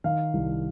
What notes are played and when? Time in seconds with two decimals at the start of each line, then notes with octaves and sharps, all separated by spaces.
0.04 D#3 F5
0.33 C2